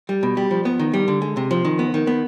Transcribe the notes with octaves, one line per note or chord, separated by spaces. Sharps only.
G3
B2
G3
F3
B3
D#3
G3
D3
G#3
C3
F3
D#3
B3
D#3
B3